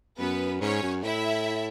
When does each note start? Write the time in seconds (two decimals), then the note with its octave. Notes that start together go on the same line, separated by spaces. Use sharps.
0.19 F#2 B3 B4
0.61 G#2 C#4 C#5
0.83 F#2
1.03 A2 E4 E5